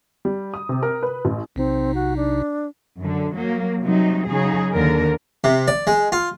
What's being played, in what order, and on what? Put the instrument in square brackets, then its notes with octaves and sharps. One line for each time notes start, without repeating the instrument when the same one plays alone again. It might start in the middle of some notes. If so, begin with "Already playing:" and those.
[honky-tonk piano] G3
D#6
C3
A#4
B4
A1
[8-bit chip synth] B1 C3 D#4 [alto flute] C4
[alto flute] F#4
D4
[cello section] F#2 D3
F#3 A#3
C3 F#3 G3 D#4
C#3 F#3 D#4 G#4
D#2 D3 A#4
[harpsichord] C3
D5
G#3
F4